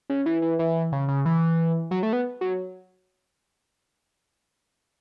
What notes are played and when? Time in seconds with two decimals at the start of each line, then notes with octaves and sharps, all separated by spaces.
0.09 C#3
0.26 E3
0.42 E3
0.59 E3
0.92 C#3
1.08 C#3
1.25 E3
1.91 F#3
2.03 A3
2.13 B3
2.41 F#3